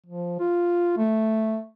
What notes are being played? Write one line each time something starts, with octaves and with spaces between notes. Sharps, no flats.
F3
F4
A3